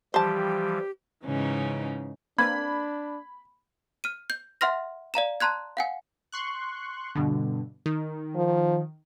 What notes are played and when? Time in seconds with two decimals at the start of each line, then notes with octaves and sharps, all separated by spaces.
0.14 E3 F3 G3 G4 C5 A5
1.23 G#2 C#3 E3 C#4 D#4
2.38 A#3 C4 D4 B4 B5 G#6
4.04 F6 D#7
4.30 G6
4.61 E5 F#5 C6 F6 A#6
5.14 D5 F5 A#5 E7
5.40 A5 A#5 C6 F#6 G#6
5.77 F5 F#5 G#5
6.32 C6 C#6 F#6
7.15 G2 B2 D3
7.86 D#3
8.36 F3